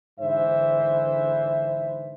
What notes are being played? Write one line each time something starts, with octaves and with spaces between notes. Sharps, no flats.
G#2 D3 E3 C5 E5